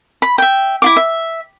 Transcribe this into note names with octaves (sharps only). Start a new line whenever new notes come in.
B5
E5 G5
E4 F4 D6
E5